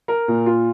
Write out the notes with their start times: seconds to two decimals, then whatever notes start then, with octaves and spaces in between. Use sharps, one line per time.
0.08 A#4
0.28 A#2
0.46 F4